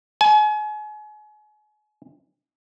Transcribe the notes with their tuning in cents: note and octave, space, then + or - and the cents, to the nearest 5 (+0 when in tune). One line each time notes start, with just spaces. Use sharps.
G#5 +35